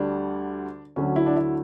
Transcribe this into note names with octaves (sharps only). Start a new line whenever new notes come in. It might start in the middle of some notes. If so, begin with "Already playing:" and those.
Already playing: D2 D3 G3 D4
D2 D3 F#3 C#4
E4
D4
E4